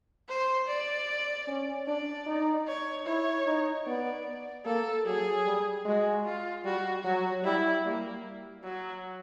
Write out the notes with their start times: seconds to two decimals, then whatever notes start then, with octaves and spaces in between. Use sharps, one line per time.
0.29 C5
0.67 D5
1.48 C#4
1.87 D4 D5
2.27 D#4
2.67 C#5
3.06 E4 C#5
3.46 D#4
3.86 B3 D5
4.65 A#3 A4
5.06 F#3 G#4
5.45 G3
5.85 G#3 F#4
6.25 F4
6.64 G3 F#4
7.04 F#3 F#4
7.44 G3 E4
7.84 G3 A#3
8.64 F#3